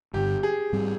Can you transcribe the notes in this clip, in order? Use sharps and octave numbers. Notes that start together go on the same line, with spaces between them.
G1 G2 D3 G4
G#4
G#2 G3 C4